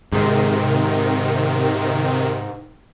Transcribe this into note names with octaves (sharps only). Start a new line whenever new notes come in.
G#2 C3 D#3